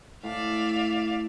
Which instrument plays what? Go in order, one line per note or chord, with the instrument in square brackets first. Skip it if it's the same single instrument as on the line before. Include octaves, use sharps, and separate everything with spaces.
[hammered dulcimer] A2 [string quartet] D5 E5 F5